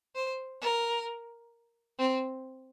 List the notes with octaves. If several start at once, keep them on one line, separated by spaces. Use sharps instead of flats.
C5
A#4
C4